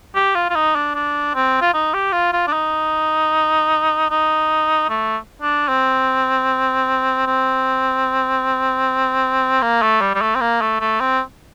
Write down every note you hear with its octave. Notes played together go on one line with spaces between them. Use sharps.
G4
F4
F4
D#4
D4
D4
C4
F4
D#4
G4
F4
F4
D4
D#4
D#4
A3
D4
C4
C4
A#3
A3
G3
G3
A3
C4
A#3
A3
A3
C4